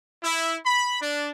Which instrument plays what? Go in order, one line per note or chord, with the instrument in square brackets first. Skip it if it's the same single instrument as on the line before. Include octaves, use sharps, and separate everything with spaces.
[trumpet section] E4
B5
D4